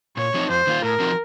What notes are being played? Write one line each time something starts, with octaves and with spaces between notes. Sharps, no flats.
A#2 C#5
F3 A3 C4 D#4
F2 C5
D#3 A#3 F4
A2 A#4
F3 C4 D#4 F#4